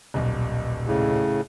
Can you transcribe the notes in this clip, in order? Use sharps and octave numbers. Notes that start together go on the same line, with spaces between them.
D#1 B1
A2 C#3